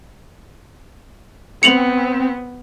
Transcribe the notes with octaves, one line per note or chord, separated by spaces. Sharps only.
B3 C4 C#7 F7 F#7